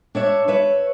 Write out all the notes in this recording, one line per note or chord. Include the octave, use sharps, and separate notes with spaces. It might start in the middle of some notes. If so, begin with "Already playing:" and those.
D4 C#5 E5
B4 C#5 E5